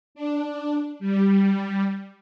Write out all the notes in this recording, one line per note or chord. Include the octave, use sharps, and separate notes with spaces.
D4
G3